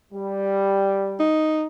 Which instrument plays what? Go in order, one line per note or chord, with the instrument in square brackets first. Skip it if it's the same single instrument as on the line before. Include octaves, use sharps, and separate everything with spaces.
[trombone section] G3
[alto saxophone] D#4